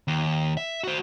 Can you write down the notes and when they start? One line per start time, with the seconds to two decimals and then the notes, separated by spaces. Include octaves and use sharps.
0.08 D#2
0.57 E5
0.84 F#4 C5